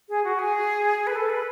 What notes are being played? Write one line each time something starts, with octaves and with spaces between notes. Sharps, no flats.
G#4
F#4
G#4
B4
A4
B4